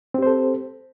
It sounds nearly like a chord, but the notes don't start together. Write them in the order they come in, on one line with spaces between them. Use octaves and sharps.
C4 G4 C5 A4